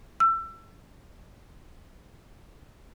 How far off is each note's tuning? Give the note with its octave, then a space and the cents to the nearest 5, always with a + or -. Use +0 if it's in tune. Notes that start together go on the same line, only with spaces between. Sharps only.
E6 +30